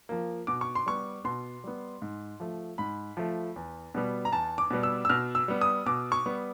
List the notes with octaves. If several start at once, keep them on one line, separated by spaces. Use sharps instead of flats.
F3 A#3
B2 D6
C#6
C6
G3 B3 C#6
B2 C6
G3 B3
G#2
F3 A3
G#2 B5
F3 A3
E2
B2 G3 B3
A#5
E2 A5
D6
B2 G3 B3
E6
E6
B2 F6
E6
G3 B3
D#6
B2 D6
C#6
G3 B3